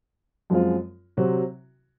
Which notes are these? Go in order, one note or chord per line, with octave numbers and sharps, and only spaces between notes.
F#2 F3 G#3 C4 F4
C3 F#3 C4 F#4